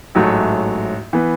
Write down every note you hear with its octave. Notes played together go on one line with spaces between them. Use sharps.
A1 G#2 F#3 A3
E3 B3